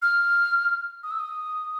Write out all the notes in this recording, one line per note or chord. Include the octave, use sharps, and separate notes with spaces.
F6
D#6
E6
D#6